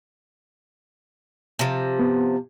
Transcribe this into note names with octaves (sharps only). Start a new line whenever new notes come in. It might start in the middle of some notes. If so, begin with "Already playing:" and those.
C3 F3
B3